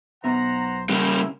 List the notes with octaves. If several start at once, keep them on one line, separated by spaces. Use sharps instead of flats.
B1 B3 C5 E5 F#5 A#5
C#3 G3 A#3 C#4 E4 F#5